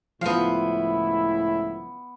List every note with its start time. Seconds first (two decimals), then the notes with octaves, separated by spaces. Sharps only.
0.21 C#2 A2 F3 B3 E4 F5